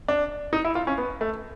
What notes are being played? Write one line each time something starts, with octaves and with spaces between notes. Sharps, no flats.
D4
D#4
E4
F4
C#4
B3
A3